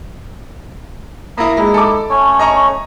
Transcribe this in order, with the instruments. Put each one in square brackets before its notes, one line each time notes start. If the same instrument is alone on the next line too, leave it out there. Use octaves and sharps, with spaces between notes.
[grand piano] A#3 E4 [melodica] A#5 B5 D#6
[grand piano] G#3 [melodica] D#4 E4
[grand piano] A4 D6
[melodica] A3 C#4 C#5
[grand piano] D#5 A#5 C#6